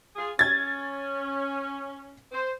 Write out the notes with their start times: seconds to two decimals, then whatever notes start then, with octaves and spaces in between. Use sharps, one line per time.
0.16 F4 G#4
0.39 C#4 G#6 A6
2.32 C5